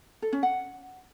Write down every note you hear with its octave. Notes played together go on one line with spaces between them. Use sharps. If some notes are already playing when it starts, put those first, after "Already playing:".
A4
C#4
F#5